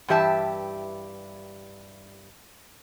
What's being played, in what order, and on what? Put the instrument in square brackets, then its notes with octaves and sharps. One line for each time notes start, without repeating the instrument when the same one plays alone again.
[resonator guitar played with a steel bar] G2 E3 G4 E5 A5